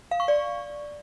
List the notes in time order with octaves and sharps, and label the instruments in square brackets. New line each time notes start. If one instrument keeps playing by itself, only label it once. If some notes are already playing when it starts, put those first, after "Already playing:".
[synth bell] F5
C#6
D5